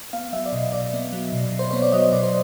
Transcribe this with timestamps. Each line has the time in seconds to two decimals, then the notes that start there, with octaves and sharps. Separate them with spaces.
0.13 B3 F5
0.33 F#3 E5
0.46 D5
0.52 B2 D#5
0.72 B2 D5
0.93 B3
1.13 F#3
1.32 B2
1.53 B2
1.59 C5
1.71 B3 C#5
1.82 D5
1.92 F#3 D#5
2.12 B2 D5
2.23 C5